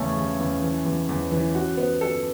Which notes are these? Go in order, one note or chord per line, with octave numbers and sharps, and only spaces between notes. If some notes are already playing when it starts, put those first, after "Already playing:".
Already playing: E2 C#3 A3 C#4
E2
E2
E3
E2
E2
E3
F#4
B3
A4